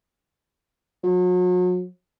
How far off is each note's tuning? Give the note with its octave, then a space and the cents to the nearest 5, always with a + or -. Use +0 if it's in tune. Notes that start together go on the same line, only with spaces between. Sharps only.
F#3 -40